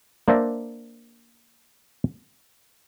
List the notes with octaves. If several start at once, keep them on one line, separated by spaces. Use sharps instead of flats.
A#3 D4 C5 D5 E5 A#5